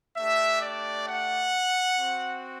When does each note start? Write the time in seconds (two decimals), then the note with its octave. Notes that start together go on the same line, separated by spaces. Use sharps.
0.17 A3 D4 G4 E5
0.62 D5
1.07 F#5
1.97 C4 F#4